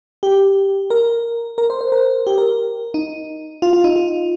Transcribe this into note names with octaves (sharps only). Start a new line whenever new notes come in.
G4
A#4
A#4
C5
C5
A#4
G4
A#4
D#4
F4
F4
D#4
F4